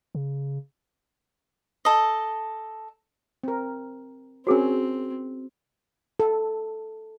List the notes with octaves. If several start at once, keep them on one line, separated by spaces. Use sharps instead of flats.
C#3
A4 D#5
C4 A#4
C4 C#4 F#4 G#4 A#4 C5
A4